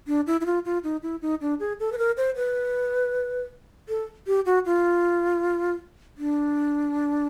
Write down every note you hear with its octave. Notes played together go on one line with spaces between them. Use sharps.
D4
E4
E4
F4
F4
D#4
E4
D#4
D4
G#4
A4
B4
A#4
C5
B4
A4
G4
F#4
F4
D4